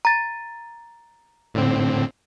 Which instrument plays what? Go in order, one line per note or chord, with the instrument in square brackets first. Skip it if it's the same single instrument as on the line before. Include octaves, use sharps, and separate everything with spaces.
[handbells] A#5 A6
[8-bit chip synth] A2 D3 C4